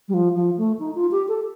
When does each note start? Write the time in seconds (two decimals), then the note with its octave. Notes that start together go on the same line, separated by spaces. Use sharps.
0.08 G3
0.14 F3
0.35 F3
0.57 A3
0.79 D#4
0.95 F4
1.11 G4
1.28 A4